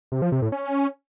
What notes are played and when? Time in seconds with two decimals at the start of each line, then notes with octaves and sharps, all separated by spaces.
0.12 C3
0.22 F3
0.32 C3
0.42 A2
0.52 C#4